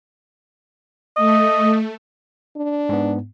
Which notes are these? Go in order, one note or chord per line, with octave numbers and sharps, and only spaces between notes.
A3 D#5
D4
G#2 B3